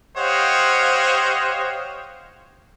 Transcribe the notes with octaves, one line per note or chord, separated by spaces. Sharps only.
G4 C5 C#5 D#5 F5 F#5